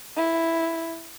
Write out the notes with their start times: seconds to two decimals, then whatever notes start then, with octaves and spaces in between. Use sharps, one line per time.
0.16 E4